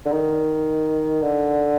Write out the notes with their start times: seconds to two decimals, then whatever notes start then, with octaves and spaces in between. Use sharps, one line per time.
0.06 D3
0.12 D#3
1.22 D3